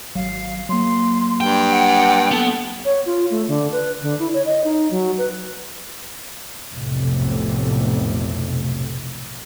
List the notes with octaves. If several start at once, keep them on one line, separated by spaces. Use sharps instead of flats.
G#1 F#3 F5
F#3 A#3 C6
G2 G5
F#5
B3 A4
C#5
F4
A3
D3
B4
D3
E4
C#5
D#5
D#4
F#3
B4
F1 B1 A2 C3